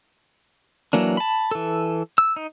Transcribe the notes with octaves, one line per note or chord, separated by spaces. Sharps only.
E3 F#3 A#3 D4
A5 B5
E3 A4
E6
D#4